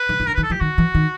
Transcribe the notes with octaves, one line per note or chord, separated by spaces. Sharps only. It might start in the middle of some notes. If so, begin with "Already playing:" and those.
Already playing: B4
D#3
D#3
D3 A#4
D#3 B4
A4
E3 G4
D#3 F#4
E3
D#3